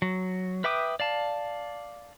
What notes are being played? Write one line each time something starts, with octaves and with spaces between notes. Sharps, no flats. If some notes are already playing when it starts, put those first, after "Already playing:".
F#3
B4 E5 G5 D6 D#6
D5 F5 A5